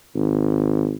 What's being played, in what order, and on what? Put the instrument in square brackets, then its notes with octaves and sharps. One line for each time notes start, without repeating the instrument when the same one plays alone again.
[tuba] G#1